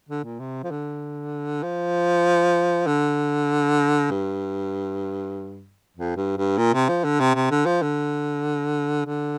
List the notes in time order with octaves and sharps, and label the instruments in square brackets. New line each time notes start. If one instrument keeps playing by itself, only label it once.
[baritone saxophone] D3
A#2
C3
F3
D3
F3
D3
G2
F2
G2
G2
A#2
C3
F3
D3
C3
C3
D3
F3
D3
D3